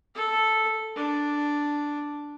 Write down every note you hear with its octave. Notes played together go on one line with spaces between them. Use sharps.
A4
D4